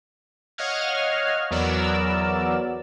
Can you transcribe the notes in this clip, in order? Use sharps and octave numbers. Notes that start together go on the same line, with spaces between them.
C#5 D#5 F5 F#5 F6 G#6
E2 F#3 B3 A#4 D5 E6